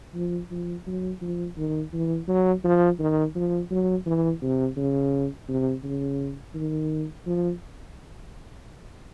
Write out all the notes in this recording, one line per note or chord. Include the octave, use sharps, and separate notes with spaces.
F3
F3
F#3
F3
D#3
E3
F#3
F3
D#3
F3
F#3
E3
C3
C#3
C3
C#3
D#3
F3